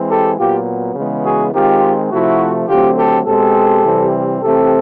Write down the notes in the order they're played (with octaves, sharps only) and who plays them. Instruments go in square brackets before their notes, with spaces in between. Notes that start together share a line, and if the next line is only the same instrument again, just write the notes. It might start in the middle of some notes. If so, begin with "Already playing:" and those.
Already playing: [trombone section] E3 G#3 C4
G4 A4
A#2 F#3 B3 F4 G4
C#3 E3 G#3 B3
F#4 G#4
D#3 G#3 C4 F4 G4
C3 F3 A3 E4 F#4
D3 F#3 A3 C4 F4 G4
G4 A4
B2 G#3 C4 G4 A4
C3 E3 G3 C4
C3 E3 A3 C4 G4 A4